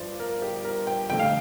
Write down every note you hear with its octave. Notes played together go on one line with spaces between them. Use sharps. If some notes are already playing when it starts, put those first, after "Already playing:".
Already playing: G1 G2 F3 C5 D5
A#4
G4
A#4
G5
F1 F2 D3 G5
F5